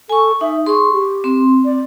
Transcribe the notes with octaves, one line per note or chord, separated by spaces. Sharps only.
A4 G#5 C#6
D#4 E5
G#4 C6 C#6
G4
C4 C6
D5